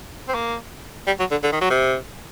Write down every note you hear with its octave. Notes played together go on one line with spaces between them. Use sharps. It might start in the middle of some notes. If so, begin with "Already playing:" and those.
C4
A#3
G3
F#3
D3
D3
D#3
F#3
C3